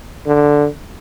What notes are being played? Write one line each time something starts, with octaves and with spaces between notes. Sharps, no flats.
D3